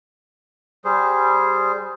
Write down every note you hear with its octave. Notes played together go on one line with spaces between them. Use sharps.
G3 G#4 C5